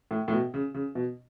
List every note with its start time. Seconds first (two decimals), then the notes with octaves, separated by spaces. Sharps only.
0.11 A2
0.28 A2
0.32 B2
0.54 C#3
0.74 C#3
0.95 B2